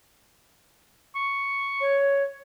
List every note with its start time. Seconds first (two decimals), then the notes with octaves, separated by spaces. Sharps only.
1.15 C#6
1.81 C#5